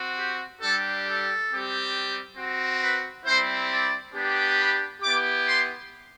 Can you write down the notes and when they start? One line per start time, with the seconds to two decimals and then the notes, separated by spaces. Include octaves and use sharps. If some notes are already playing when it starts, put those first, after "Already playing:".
Already playing: C4 F#4
0.17 G4
0.61 G3 D4 G4 A4
1.06 A4
1.50 G3 C4 G4
2.38 C4 F#4
2.81 B4
3.25 G3 C4 E4 C5
3.70 D5
4.14 B3 D4 G4
4.58 B5
5.02 B3 E4 G4 D6
5.46 C6